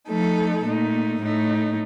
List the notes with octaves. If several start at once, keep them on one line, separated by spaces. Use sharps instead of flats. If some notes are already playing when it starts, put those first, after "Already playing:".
F3 A3 D#4 A4
A#2 A3 D#4
A2 A3 D#4